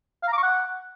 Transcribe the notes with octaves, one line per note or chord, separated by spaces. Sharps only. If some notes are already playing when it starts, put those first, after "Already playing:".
F5
A#5
D6
C#6
F#5